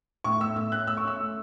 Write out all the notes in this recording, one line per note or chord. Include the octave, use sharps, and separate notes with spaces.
A2 C#6
A3 E6
A2 E6
C#4 F#6
A3 E6
C#6
C#4 E6
A3